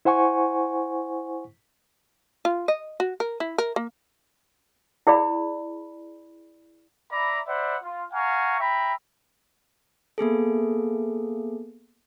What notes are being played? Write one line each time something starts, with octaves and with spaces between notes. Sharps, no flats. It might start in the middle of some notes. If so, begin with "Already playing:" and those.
E4 C5 F#5 G#5 C#6
F4
D#5
F#4
A#4
E4
A#4
A#3
E4 G#4 D5 B5
D5 E5 A#5 B5
C5 D5 E5 F#5 B5
F4
F5 F#5 G#5 A#5 C#6
E5 G5 A#5 B5
A#3 B3 G#4 A4